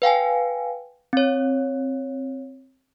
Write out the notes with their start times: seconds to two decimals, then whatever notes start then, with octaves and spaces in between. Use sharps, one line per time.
0.02 B4 F5 G5 G#5
1.13 C4 C#5